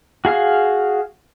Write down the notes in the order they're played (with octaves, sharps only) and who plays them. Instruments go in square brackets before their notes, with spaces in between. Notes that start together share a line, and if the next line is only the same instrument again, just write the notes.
[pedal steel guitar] F#4 G#4 F5 F6